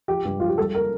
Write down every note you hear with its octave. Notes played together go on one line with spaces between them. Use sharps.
F3 G4
G2
F3 F4
G4
G3 A4
A#3 A#4